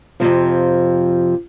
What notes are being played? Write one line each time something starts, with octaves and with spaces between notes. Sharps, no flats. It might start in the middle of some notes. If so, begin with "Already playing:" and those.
F2 A2 C3 F3